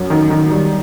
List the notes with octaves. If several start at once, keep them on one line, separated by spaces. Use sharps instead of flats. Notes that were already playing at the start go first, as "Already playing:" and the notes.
Already playing: F#2 F#3
D#3
D#3
G3